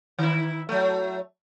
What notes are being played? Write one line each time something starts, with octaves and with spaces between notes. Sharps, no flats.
D#3 E4
F#3 A3